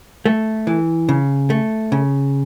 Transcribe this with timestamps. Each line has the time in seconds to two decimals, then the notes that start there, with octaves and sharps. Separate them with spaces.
0.26 A3
0.67 E3
1.09 C#3
1.50 A3
1.92 C#3